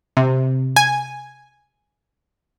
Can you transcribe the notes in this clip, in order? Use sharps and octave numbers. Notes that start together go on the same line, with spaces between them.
C3
G#5